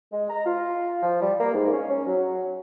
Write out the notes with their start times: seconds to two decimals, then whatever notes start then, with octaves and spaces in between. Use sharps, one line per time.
0.12 G#3
0.30 A#5
0.45 F4
1.02 F3
1.21 G3
1.39 A#3
1.54 G#2
1.72 C#4
1.89 C#4
2.07 F#3